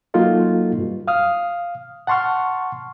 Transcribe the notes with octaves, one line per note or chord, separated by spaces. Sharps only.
F#3 A#3 D#4 F4 F#4 A4
G2
F5 D#6 F6
F#5 A5 C6 C#6 F6